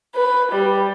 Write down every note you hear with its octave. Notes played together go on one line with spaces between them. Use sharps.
B4
G3